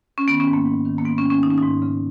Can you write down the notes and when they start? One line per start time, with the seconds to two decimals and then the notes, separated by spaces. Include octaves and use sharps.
0.18 C#4
0.28 D#3 B3
0.40 C#4
0.47 G#2
0.53 A#3
0.66 G#2
0.85 D#3
0.98 A#3
1.05 G#2 B3
1.18 C#4
1.25 D#3
1.30 C#4
1.43 D#3 D#4
1.50 C#4
1.58 G#2 D#4
1.82 C#3